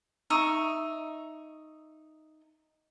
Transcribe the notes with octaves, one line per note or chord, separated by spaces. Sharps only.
D#4 D#5 E5 C#6